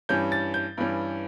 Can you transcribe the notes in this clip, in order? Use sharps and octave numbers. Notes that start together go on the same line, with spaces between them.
G2 E3 G3 C#4 G6
A6
G6
G2 E3 G3 C#4